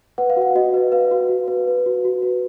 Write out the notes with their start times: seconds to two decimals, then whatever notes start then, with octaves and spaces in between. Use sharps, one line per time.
0.18 B4 F#5
0.30 F5
0.37 F#4
0.42 F#5
0.55 F#4 D#5
0.74 B4
0.92 B4 F5
1.11 F#4
1.29 F#4
1.48 B4
1.68 B4
1.86 F#4
2.05 F#4
2.22 B4